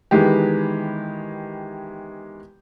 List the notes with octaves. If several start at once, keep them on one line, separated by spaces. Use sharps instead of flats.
D#3 E3 G#3 B3 G4